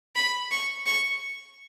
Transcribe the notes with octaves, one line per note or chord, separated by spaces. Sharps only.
B5
C#6
C#6